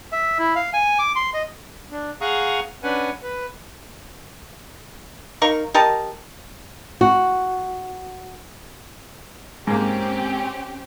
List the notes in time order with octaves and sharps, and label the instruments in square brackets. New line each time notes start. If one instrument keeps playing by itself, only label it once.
[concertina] E5
E4
F5
G#5
D6
C6
D#5
[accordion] D4
G#4 F5 F#5 A#5 C#6 D#6
C#4 D4 B4 F#5 G#5
B4
[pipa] D#4 A#4 F5 C#6
G4 A#4 D#5 A5
[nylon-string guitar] F#4
[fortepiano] G#2 A#3 [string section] C4 C#4 G4